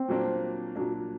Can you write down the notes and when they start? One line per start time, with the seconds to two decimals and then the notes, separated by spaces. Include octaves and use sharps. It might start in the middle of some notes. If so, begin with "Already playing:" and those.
Already playing: C4 C5
0.08 A#2 F#3 A#3 D4
0.76 A#2 F#3 A#3 D4